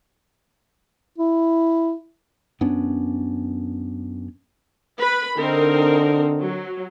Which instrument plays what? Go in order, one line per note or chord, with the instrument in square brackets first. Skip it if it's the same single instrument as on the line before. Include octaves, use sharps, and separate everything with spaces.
[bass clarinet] E4
[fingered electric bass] F#2 B3 C#4 D4
[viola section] B4 B5
[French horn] D3 [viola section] C4 D#4 A#4
[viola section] F#3